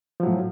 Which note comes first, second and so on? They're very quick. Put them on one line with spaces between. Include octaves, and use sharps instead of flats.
F3 F#3 A2